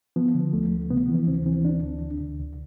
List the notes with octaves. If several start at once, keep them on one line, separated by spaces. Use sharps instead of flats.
F3 B3
D3
D2 A3
F3
C3 B3
E3 B3
D2 C4
E3 C4
C4
D2 D4
D2
D2
D2
C2